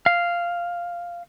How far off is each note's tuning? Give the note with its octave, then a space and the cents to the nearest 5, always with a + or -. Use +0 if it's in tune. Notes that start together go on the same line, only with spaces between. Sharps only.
F5 -5